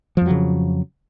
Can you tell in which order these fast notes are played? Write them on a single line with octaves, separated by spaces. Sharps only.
F3 F2 F#3 C#3